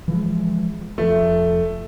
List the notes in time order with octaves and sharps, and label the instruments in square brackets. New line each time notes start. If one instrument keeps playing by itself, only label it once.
[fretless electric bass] E3 F3 G#3
[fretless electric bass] F1 F3 [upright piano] A3